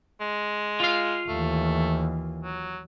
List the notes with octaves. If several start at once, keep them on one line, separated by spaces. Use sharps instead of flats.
G#3
F4 F5
D#2 E3 A3
F#3